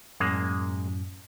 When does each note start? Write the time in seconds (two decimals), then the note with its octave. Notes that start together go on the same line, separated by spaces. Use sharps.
0.20 F#2 A2 G#3 A#3